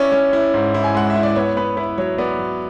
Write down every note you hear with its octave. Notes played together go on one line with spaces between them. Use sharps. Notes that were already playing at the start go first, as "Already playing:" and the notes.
Already playing: C#4 E4 D5
C#4
E4
G#2
E4
G#5
G#3 F#5
E5
E4
D5
B3 C#5
B3 B4
E4 B4
F#3 C#5
B3 D5
F#3